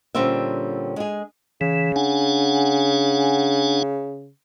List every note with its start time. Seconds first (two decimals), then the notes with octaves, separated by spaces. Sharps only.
0.15 A#2 D3 G3 C4 C#4 E5
0.96 G#3 G#4
1.61 C#3 E3
1.96 D4 F#5 G#5